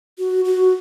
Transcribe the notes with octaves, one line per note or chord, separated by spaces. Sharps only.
F#4
F#4